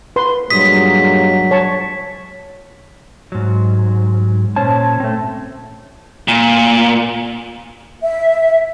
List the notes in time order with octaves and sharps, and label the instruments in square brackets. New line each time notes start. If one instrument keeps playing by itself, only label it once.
[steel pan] B4 C6
[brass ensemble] G2 A#2 G#3 [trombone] F#3 [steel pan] D#6 [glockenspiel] B6
[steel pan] C#5 A5 C#6
[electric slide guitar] G#2 F#3
A#2 C#4 C5 C#5 A5
A3 C4
[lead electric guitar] A#2
[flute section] E5